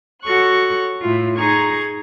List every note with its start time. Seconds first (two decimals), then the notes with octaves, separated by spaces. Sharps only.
0.23 F#4 A4 C#5 C#6 F#6
1.01 A2 E4 F4
1.36 D#4 G#4 A#5 C#6 G#6